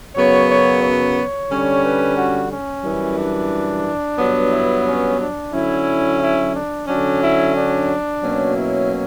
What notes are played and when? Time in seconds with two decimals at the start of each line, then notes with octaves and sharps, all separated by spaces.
0.15 F#2 C#3 F#3 B3 C#5
0.48 C#5
0.82 C#5
1.50 D3 G3 C#4
1.83 B4
2.16 F#4
2.50 C#4
2.84 F#2 E3 G3
3.17 D4
4.19 G2 F#3 B3
4.52 E4
4.86 C#4
5.20 D4
5.52 D3 F#3 C#4 E4
6.21 E4
6.54 D4
6.87 D3 F#3 C#4 D4
7.21 E4
7.54 D4
8.22 B2 F#3 A#3 C#4
8.56 E4